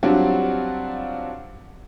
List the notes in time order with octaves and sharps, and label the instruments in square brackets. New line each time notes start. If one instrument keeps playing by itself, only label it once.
[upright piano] F#3 G3 C4 D4 F4 F#4